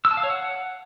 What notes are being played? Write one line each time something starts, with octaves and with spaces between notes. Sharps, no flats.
E6
A5
F5
C#5
F#5